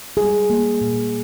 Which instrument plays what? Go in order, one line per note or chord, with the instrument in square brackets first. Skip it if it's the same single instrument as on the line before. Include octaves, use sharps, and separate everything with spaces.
[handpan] G3 G#4
A#3
A#2